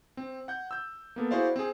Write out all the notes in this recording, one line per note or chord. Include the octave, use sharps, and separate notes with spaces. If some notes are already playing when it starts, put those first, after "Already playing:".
C4
F#5 G6
E6 G6
A#3 B3 A4
E4 F#4 G#4 C5 D5 F5
C4 G#4